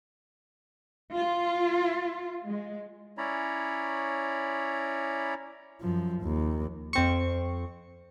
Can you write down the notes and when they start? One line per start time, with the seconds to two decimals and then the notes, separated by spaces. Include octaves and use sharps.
1.14 F4
2.46 G#3
3.18 C#4 E4 C#5 D5 A#5 B5
5.81 F#2 F3
6.22 D#2
6.93 F2 C4 C#6